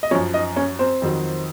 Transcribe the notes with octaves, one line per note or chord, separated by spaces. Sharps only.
D#5
F#2 F3 C#4 C#5
D#4 D#5
C#4 C#5
C4 C5
F2 D#3 F#3